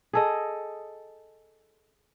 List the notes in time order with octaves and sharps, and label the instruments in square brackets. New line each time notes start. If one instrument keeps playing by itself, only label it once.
[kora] G#4 A4 D#5